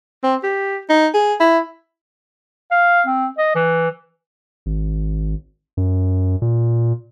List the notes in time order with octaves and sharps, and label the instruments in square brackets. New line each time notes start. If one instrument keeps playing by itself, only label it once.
[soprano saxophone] C4
G4
D#4
G#4
E4
[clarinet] F5
C4
D#5
E3
[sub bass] G#1
F#2
A#2